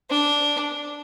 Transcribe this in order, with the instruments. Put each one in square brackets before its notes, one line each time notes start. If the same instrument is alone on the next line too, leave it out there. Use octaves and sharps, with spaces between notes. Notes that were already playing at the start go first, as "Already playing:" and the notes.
[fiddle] D4